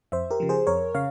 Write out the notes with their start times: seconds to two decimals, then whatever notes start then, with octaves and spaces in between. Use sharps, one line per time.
0.12 F2 C5 E5
0.31 G4 A#4
0.40 C#3 F3
0.49 G#4 C5
0.67 F2 A#4 C#5
0.95 C#3 C#5 F5